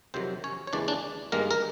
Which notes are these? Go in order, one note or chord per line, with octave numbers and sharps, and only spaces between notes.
F2 C3 D#3 F#3 C4 C5
C#4 C#5
C#5
D#2 C#3 E3 G#3 D4 D5
D4 D5
G2 D#3 G#3 A#3 A#4
A#4